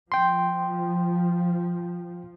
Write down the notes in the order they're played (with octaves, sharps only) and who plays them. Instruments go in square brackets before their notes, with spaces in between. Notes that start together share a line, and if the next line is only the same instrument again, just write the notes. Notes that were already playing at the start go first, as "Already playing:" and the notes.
[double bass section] F3 [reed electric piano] G5 C6